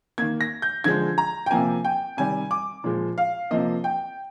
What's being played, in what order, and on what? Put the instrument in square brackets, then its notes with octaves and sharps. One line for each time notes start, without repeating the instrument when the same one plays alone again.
[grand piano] D#3 A#3 G#6
A#6
G6
D3 F3 G#3 G#6
A#5
G5
C3 F3 A#3 G#5
G5
C3 D#3 G3 G#5
D6
A#2 F3 G#3
F5
C3 F3 A#3 D#5
G5